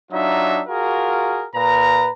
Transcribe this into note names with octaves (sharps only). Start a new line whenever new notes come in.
F#3 D4 D#4 F4 E5
F4 F#4 G#4 A#4
A#2 B4 A#5